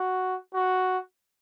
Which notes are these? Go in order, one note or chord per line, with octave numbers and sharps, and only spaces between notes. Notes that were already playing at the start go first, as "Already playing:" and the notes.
Already playing: F#4
F#4